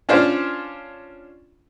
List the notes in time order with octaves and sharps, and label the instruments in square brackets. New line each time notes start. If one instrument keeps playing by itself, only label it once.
[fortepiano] C#4 D4 F4 C5 D5